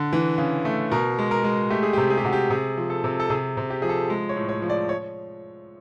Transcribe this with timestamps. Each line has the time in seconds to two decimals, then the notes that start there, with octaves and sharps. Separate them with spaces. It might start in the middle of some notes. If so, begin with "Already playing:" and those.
Already playing: D3
0.13 E3
0.38 C#3
0.65 A3
0.91 B2 A#4
1.19 G#3
1.31 A#4
1.44 G#3
1.70 A3 G4
1.83 G#4
1.93 G4
1.97 C3
2.10 G#4
2.18 G4
2.24 C3 F#4
2.33 G4
2.50 C3 G#4
2.78 F3
2.90 A4
3.04 C3
3.20 A4
3.30 C3 G#4
3.57 C3
3.70 G4
3.82 F3 G#4
3.89 A4
4.10 G#3
4.29 C#5
4.36 A2
4.49 C#5
4.62 F3
4.70 D5
4.89 C#5